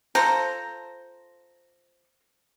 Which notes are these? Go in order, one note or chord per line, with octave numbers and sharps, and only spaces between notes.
F4 A4 C5 A#5